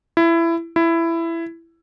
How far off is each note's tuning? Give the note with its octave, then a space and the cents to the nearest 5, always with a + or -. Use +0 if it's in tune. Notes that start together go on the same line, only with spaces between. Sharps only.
E4 +20
E4 +15